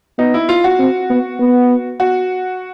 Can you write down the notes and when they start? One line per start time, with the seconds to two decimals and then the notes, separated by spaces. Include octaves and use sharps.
0.18 B3 D#4
0.34 E4
0.49 F4
0.64 F#4
0.79 C4
1.10 B3
1.39 B3
2.00 F#4